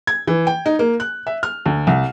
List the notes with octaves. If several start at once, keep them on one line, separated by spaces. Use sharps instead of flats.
G#6
E3
G5
D#4
A#3
F#6
E5
F6
D2
C2